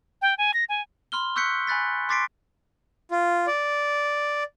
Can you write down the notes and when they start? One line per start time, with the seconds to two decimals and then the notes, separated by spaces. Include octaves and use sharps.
0.22 G5
0.38 G#5
0.54 A#6
0.69 G#5
1.12 B5 C6 F6 G7
1.36 C#6 E6 F#6 G6 B6 C#7
1.67 G#5 B5 F#6 A6 B6
2.09 C6 D6 A6 B6 C7 D7
3.11 F4
3.47 D5